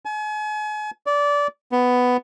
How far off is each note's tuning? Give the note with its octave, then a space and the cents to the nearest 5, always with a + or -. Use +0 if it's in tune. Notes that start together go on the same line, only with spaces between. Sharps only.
G#5 +40
D5 -20
B3 +10